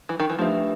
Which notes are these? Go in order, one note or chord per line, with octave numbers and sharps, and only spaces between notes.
E3
D#3
E3
F3 A3 D4 G4 B4 E5